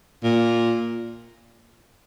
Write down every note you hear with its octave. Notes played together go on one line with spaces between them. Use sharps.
A#2